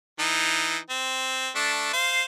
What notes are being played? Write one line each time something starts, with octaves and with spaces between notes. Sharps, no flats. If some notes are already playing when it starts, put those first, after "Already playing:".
E3 D#4
C4
A3 D4
C5 F5